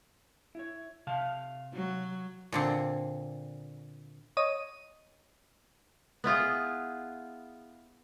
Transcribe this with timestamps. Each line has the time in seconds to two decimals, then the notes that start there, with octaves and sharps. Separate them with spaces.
0.55 E4 C#5
1.07 C3 F5 A5
1.74 F#3
2.52 A#2 D3 C4
4.37 C#5 D#5 D#7
6.24 B3 E4 F4 G#4